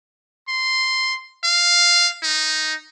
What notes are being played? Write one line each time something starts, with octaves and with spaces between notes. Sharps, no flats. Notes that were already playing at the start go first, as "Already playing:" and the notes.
C6
F5
D#4